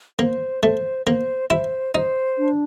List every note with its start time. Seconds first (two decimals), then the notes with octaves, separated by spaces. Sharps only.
0.19 A#3 C5
0.63 A3 C5
1.06 A#3 C5
1.50 E4 C5
1.95 D#4 C5
2.38 D4